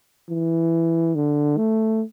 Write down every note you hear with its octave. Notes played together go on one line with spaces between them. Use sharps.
E3
D3
A3